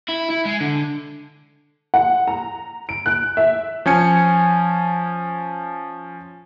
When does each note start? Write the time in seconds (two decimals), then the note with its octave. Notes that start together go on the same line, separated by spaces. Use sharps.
0.09 E4
0.30 E4
0.45 G#3
0.60 D3
1.94 F#5
2.28 A#5
2.89 D7
3.06 F#6
3.37 E5
3.86 F3 C#4 G#5 C#7